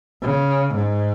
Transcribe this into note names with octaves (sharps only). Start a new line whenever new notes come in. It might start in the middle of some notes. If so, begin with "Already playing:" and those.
C#3
G#2